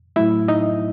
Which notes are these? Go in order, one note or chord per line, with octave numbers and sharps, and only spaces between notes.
A2 F#3 A3 E4 E5
D#4 D#5